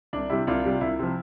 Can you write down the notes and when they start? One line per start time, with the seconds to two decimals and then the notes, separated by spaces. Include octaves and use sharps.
0.13 C2 D4
0.30 C3 G3 E4
0.47 C2 D4 F4
0.65 C3 G3
0.81 C2 E4
0.99 C3 F3